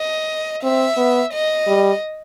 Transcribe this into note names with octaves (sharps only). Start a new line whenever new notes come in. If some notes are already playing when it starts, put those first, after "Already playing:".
Already playing: D#5
C4 E5
B3
D#5
G3